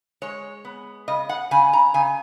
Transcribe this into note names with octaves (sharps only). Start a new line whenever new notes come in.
G#3 C#5
B3
C#3 D#5
F#5
C#3 G#5
A#5
C#3 G#5